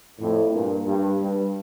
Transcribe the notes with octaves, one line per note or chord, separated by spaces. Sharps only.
F2 A2
G2 A#2
G2
G2